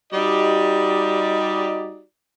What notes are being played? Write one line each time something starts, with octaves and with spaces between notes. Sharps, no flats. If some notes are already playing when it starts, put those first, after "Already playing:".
G3 D#4 F#4 G4 D5 D#5